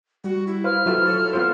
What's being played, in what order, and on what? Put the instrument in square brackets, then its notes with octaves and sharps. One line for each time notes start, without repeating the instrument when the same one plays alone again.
[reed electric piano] G3 [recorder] F#4
[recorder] E4
[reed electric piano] B4 C5 F5 [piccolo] F6
[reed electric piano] F#3 [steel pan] E4 F4 [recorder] A4
[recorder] A4 [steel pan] C#5
[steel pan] B3 F4 C5